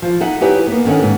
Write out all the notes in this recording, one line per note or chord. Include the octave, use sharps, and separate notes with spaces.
F3
D#4 G#4 E5 F#5
D#4 E4 G4 G#4 B4 C#5
A#3 B3
D3 D#3 C#4 C#5 F#5
G#2 C#3